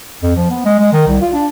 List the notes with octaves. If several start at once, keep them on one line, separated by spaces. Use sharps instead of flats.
F2
F3
B3
G#3
G#3
D#3
C2
F4
D4